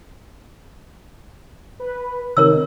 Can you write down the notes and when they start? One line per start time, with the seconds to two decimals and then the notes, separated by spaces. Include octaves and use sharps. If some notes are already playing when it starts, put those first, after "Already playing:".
1.80 B4
2.37 C3 D#3 A#4 C#5 E6